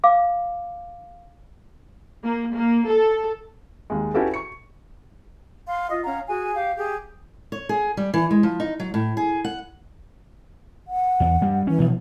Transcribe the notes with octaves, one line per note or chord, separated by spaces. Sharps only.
F5 D6
A#3
A#3
A4
D#2 G#3
C#4 E4 F#4 G4 A4 B4
C#6 C#7
F5 C6
F4 D#5
C#4 F5 F#5 A#5
F#4 G#4 G#5
G4 F5
G4 G#4
C#5
G#4
G3
E3
G#3
F3
D#4
F#3
A2
G#4
F#5
F#5
E2
G2 G3
E3 C#4
B2 F3